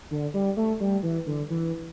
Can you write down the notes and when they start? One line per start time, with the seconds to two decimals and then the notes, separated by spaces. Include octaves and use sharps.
0.11 D3
0.34 G3
0.57 A3
0.80 G3
1.03 E3
1.26 D3
1.50 E3